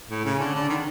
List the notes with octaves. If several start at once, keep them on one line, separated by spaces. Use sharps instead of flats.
A2
C#3
D3
D3
D#3